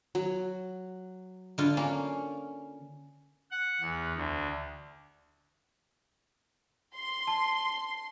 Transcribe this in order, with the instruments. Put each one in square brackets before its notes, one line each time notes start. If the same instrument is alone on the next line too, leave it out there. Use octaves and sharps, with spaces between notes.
[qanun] F#3
[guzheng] D3 F4
[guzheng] A#3 [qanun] C#4
[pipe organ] F#5
E2
D2
[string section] C6
[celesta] A5